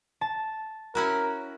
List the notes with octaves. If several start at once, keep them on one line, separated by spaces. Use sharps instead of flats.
A5
C#4 E4 F#4 A#4